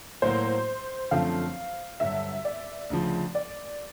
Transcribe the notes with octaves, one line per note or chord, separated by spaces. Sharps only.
A2 F#3 A#3 C5
F#2 D3 F3 A3 C4 F5
G2 D3 F#3 E5
D5
D2 C#3 F3
D5